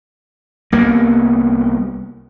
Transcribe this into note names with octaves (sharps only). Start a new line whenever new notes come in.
C2 A#3 B3